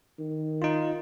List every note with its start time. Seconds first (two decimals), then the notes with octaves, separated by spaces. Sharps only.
0.19 D#3
0.62 D#4 F4